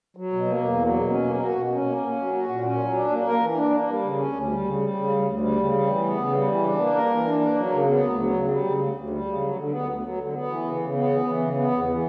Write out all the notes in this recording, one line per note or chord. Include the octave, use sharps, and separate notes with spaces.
F#3
B2
A#3
E2
F#3
B2
C#4
A#3
F#4
B2
C#4
A#3
C#4
F#3
F#4
A#2
C#4
F#3
D4
A#3
A#4
E3
D4
A#3
G3
C#3
C#4
D2
G3
C#3
G3
C#3
D2
D2
G3
C#3
G3
E3
B3
C#3
G3
E3
D4
A#3
A#4
E3
D4
A#3
F#3
C#3
B3
D2
F#3
C#3
G3
C#3
D2
D2
G3
C#3
F#3
D3
B3
D2
F#3
D3
B3
E3
C#3
C#3
B3
E3
E3
C#3
B3
E2
E3